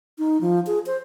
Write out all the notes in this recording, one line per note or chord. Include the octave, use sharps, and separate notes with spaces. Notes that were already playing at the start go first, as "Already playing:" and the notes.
D#4
F3
G#4
C5